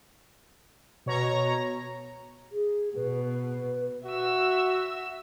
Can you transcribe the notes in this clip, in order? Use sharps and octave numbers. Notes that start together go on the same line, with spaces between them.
B2 C#5 A#5
G#4
B2 B4
F#4 E5 E6